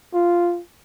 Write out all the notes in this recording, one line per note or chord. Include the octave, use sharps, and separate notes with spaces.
F4